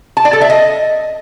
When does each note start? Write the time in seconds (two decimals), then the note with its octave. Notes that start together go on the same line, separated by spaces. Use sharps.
0.17 A5
0.25 D5
0.33 A4
0.41 E5
0.50 D#5